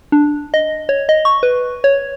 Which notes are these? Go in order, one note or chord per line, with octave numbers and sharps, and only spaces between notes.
D4
D#5
C#5
D#5
C#6
B4
C#5